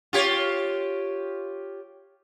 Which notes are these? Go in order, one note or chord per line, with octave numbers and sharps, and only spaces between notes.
F4 G4 C#5